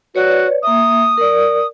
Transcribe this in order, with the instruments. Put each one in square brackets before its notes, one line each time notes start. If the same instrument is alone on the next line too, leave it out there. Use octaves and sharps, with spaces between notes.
[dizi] F#4 [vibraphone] B4 C#5 D5
[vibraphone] A#3 E5 [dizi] D#6
[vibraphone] A#4 D5